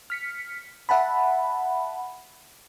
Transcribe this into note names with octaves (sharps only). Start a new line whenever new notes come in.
F6 B6 C#7
E5 F#5 A5 B5